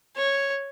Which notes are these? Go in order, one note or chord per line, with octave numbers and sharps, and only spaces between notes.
C#5